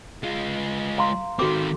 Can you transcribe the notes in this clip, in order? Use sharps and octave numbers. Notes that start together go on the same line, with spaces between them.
G#3 F4
F5 A#5 C6
D#3 C4 F#4 A4 D6